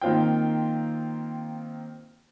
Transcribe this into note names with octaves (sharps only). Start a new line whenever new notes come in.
D#3 A#3 C4 F4 G5